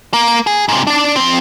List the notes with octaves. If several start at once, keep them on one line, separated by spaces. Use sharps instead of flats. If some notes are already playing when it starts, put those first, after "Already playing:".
A#3
G#4
G#2 C3
D4 D5
F3 C4